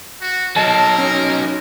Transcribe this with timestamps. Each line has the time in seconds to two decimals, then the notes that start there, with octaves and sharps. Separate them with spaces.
0.21 F#4
0.56 F#3 D#4 A#4 A5
0.98 C#4